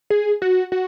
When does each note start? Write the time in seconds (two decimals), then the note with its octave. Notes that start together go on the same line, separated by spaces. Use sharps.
0.10 G#4
0.42 F#4
0.72 F#4